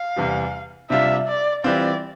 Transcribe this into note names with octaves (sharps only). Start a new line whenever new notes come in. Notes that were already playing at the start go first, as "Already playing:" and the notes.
Already playing: F5
E2 C3 E3 G3
C3 G3 D4 F4 E5
D5
E3 G3 C4 F4 D5